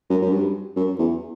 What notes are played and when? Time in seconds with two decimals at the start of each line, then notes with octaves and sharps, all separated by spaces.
0.10 F#2
0.22 F#2
0.32 G2
0.76 F#2
0.99 E2